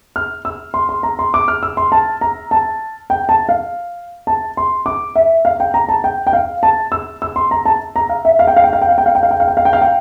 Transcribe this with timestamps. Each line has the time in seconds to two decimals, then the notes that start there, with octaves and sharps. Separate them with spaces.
0.16 F6
0.45 E6
0.74 C6
0.89 C6
1.03 A#5
1.19 C6
1.34 D6
1.48 F6
1.63 E6
1.77 C6
1.92 A5
2.21 A#5
2.51 A5
3.10 G5
3.29 A5
3.49 F5
4.27 A5
4.57 C6
4.86 D6
5.16 E5
5.45 F5
5.60 G5
5.74 A#5
5.89 A5
6.04 G5
6.27 G5
6.33 F5
6.63 A5
6.92 E6
7.22 E6
7.36 C6
7.51 A#5
7.66 A5
7.96 A#5
8.09 F5
8.25 E5
8.39 F5
8.47 G5
8.57 F5
8.64 G5
8.73 F5
8.81 G5
8.89 F5
8.98 G5
9.06 F5
9.15 G5
9.23 F5
9.31 G5
9.40 F5
9.48 G5
9.57 F5
9.65 G5
9.73 F5
9.81 G5